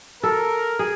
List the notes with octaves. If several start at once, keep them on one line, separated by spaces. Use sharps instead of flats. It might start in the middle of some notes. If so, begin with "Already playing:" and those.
A4 A#4
G#4